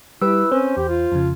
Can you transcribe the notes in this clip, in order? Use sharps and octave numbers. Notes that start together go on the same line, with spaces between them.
G3 E4 G4 B4 E6
C4 C#4 C5
E2 G4
F4
F2 C#3